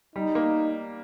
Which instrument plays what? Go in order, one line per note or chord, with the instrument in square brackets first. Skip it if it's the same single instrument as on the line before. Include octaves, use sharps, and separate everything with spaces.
[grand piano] G3 [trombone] D#4
[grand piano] A#3